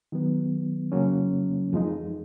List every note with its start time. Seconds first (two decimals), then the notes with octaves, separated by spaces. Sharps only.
0.12 D#3 F#3 B3
0.92 F2 C#3 F#3 A#3 C#4
1.73 F2 F3 G#3 D#4